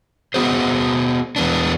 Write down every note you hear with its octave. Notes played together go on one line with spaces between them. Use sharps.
B3 F#4 G#4 C5
E2 B3 D4